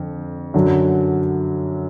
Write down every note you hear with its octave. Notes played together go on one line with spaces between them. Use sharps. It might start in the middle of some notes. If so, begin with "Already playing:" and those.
Already playing: F2 D3
F#2 D3 F#3